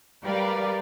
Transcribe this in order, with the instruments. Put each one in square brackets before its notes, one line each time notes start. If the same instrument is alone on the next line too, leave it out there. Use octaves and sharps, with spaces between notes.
[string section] G3 G4 A#4 B4 D5 F5